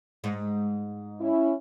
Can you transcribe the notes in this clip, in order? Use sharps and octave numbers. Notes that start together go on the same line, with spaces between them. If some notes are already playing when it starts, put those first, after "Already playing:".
G#2
C#4 E4